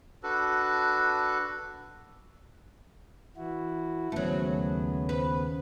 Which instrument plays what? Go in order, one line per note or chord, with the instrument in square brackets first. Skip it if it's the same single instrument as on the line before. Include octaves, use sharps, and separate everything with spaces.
[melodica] D4 F#4 A4 B4
[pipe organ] E3 E4 F#4
[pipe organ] D#2 C#3 B3 [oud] F#3 A3
[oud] B4